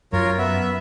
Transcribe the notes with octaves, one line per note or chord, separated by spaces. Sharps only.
F#2 F4 A#4 C#5
B3 E5